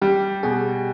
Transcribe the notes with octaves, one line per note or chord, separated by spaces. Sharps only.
G3 G4
B2 G#4